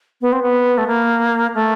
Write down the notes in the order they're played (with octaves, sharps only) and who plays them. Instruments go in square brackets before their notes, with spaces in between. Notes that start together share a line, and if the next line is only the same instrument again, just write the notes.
[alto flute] B3
C4
B3
A3
A#3
A3